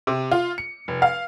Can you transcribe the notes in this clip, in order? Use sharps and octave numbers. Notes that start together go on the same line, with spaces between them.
C3
F4
C#7
F1
F5